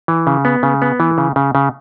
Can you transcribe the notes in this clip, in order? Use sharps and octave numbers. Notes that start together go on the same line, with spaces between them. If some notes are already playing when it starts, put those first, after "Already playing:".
E3
C#3
B3
C#3
B3
E3
C#3
C#3
C#3